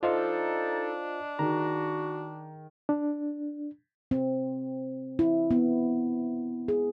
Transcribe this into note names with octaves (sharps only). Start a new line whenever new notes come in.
D4 D#4 F4 A4 C5 D#5 F5
D#3 F#4 G#4 A#5
D4
C4
E4
B3
G#4